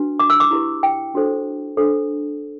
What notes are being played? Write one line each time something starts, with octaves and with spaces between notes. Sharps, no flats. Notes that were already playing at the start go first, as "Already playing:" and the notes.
Already playing: D4 F#4 B4
D6
E6
D6
E4 G4 B4
G5
D4 F#4 A4 C5
D4 A4 C5